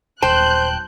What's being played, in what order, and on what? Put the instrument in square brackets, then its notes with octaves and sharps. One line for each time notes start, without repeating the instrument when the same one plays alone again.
[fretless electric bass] D#1 [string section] B1 F#6 G6 [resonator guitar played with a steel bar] C5 [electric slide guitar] G5 A5